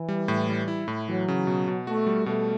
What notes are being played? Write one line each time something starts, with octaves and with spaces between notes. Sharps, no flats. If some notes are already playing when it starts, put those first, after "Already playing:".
Already playing: E3
G3
A2
G3
E4
A2
E3 F#3
C#3
B2
B2
A3 F#4
G3
B2 A3